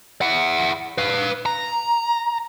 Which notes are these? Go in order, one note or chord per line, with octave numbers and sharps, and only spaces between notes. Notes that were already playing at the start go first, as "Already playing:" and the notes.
E4 F#5
B4 F5
A#5